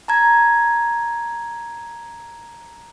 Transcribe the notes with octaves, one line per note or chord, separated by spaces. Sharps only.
A5 A#5 G#6